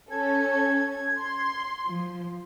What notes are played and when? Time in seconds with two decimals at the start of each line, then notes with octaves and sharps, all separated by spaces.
0.10 C#4 A4 G#6
1.18 C6
1.86 F3